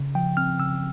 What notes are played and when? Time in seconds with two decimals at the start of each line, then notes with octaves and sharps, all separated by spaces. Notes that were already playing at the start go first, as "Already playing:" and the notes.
Already playing: C#3
0.15 F3 G5
0.37 C4 F6
0.59 C#3 E6